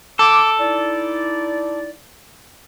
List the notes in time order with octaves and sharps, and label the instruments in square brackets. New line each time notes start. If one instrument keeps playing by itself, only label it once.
[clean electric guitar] A4 [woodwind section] D6
[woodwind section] D#4 E4 D5